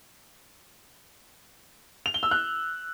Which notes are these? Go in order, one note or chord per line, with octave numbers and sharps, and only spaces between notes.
F7
G7
E6
F#6